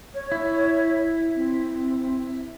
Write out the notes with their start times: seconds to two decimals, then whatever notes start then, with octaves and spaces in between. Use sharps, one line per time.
0.14 C#5
0.32 E4
1.35 C4